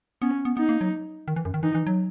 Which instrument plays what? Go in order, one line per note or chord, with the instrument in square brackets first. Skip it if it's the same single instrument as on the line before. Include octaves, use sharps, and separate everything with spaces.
[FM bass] B3 [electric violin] C#4
[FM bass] B3
[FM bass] B3 [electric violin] D#4
[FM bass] A#3
F#3
D#3
E3
F#2
D#3
[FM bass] E3 [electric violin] D#4
[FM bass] E3
F#3